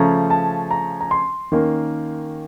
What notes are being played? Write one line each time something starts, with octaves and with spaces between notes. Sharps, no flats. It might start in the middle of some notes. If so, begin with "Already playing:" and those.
Already playing: C#3 F3 A3 C#4 A#5
A5
A#5
A#5
C6
D#3 A#3 C#4